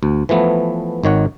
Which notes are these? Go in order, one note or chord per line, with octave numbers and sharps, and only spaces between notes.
D2
E3 F3 A3 B3
G#1 D#3 C#5 F#5